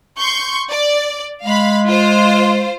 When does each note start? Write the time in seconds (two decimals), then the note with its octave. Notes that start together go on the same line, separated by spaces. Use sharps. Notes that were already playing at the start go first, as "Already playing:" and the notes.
0.19 C6 C#6 G6
0.70 D5
1.44 G#3 F5 B5
1.87 F4 C5